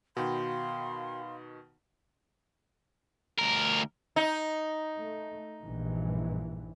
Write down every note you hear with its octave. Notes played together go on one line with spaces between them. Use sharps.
B2 D#3 F#4 F5 G5 B5 C6
D2 A#4
D#4
A3
A#1 G2 E3